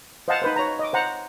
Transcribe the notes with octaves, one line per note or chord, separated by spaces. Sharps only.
C5 D#5 F5 F#5 A5
D#4 B4 C5
C#5 A#5
D#5 D6
C5 F#5 A#5